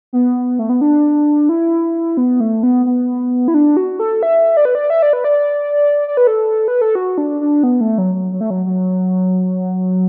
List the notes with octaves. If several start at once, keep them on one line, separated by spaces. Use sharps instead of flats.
B3
A3
B3
D4
E4
B3
A3
B3
B3
E4
D4
F#4
A4
E5
D5
B4
D5
E5
D5
B4
D5
D5
B4
A4
B4
A4
F#4
D4
D4
B3
A3
F#3
F#3
F#3
A3
F#3
F#3